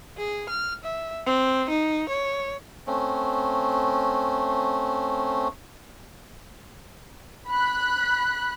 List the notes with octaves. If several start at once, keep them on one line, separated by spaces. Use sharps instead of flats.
G#4
F6
E5
C4
D#4
C#5
A3 C4 C#4
B5 F#6